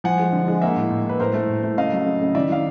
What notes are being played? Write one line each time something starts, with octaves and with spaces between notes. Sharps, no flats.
F3 F#5 G#5
G#3
D3
G#3
A#3 E5 F#5
A2
A2
A2 B4
A2 A#4 C5
A3
A2
A3
C#3 D#5 F5
F#3
C#3
C#3
D#3 D5 E5
D#3 F5